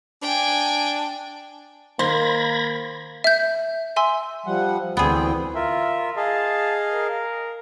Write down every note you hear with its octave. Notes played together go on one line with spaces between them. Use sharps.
D4 G5 G#5
D#3 A#3 A#4 C5 B5 G#6 A#6
E5 G6
E5 G#5 C6 E6
F3 G3 F#5
D2 E3 B3 C4 G#4 G5
F4 A#4 E5
G#4 D#5 F5 A5
A#4